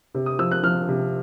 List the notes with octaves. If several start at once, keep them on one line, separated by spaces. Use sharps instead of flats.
C3
D#6
F3 E6
F#6
F3 F6
C3